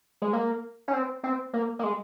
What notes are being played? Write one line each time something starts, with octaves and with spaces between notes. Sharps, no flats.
G#3
A#3
C#4
C4
C4
A#3
A#3
G#3